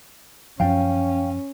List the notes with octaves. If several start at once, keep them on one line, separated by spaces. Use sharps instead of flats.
F#2 F3 C#4 F5 G5